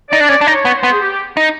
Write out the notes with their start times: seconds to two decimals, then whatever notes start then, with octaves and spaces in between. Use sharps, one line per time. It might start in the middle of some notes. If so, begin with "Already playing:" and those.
0.10 D#4 D5
0.20 D4
0.29 C#4 D5
0.41 D4
0.47 D#4
0.53 C#5
0.65 B3
0.77 C5
0.83 B3
0.91 G#4
1.01 G4
1.37 D#4